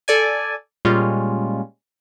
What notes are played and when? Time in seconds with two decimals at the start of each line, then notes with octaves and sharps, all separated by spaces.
0.08 A4 D5 G#5
0.85 A#2 G3 G#3 C#4 F4